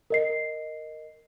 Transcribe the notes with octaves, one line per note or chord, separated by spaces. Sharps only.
A#4 D#5 C7